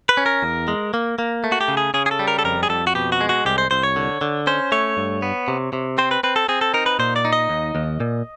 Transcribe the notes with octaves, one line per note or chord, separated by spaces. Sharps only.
B4
C#4
A#4
E2
G#3
A#3
A#3
A3
F#4
G4
C#3
G#4
C#3 G#4
G#4
A4
G3
A#4
A4
F2 A#4
G#4
F2 A4
F#4
B2 G4
F#4
G#3
F#4
C2 G4
C5
C2 C5
C#5
D3
D3
C#4 C5
A3 C#5
G2
B3
C3
C3
C4 C5
B4
C4 B4
A4
C4 G#4
A4
D#4 A#4
B4
A#2 C5
D5
D#4
D#5
D#2
D#2
A#2